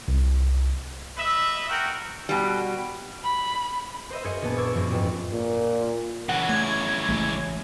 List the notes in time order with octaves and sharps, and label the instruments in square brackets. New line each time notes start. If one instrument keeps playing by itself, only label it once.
[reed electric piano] C2
[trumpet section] B4 D#5 E5
F#4 G#4 A#4 F#5 G5
[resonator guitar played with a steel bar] B2 G3
[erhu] B5
[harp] C5 D#5 E5
F#2 G#4 D#5 G#6 C#7
A#1 B3 A5
C#6 D6 E6 G#6
F#2 F3 C#6
A1 F2 G#2
[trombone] A#2
[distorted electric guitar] C#3 E3 [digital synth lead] F#5
[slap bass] A3 [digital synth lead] G#6
[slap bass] A1 G#3 A3